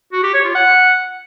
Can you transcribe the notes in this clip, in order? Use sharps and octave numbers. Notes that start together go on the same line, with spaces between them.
F#4
G4
C#5
F4
F#5